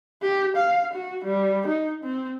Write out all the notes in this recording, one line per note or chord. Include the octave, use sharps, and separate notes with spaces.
G4
F5
F#4
G3
D#4
C4